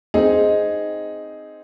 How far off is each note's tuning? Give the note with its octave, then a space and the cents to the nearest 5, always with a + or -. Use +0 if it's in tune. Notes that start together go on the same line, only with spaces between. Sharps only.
C4 +0 D#4 +0 G#4 +0